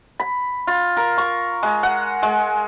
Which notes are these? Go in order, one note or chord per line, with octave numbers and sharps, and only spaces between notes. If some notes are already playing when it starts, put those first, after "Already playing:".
B5
F4
A#4
C#6
G#3
F#5
G#3